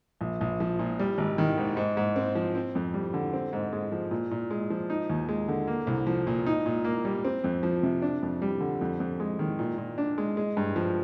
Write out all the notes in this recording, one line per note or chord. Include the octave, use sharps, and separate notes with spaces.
A#1
A#1
F3
A#2
G3
G#1
D#3
G#2
G#2
G#2
C4
F3
C4
F2
G3
D3
C4
G#2
G#3
F3
A#2
A#2
G#3
F3
D#4
D#2
G#3
D3
A#3
C2
F3
A#2
D#4
A#2
A#3
G3
C4
F2
F3
C3
D4
F2
G3
D3
F2
F2
G#3
D#3
A#2
A#2
D4
G#3
G#3
G2
F3